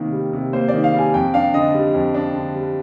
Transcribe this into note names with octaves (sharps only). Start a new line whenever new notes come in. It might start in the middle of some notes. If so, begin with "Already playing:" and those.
Already playing: C3 D#3 G3 A#3
G3
C3
A#3 C5
D5
D#3
F5
G3
G#5
F2 G5
D4 F5
D3 D#5
G3
F2
D4
D3
G3